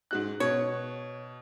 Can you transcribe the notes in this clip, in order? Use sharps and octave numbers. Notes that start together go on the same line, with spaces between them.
G#2 F#4 F#6
B2 C#5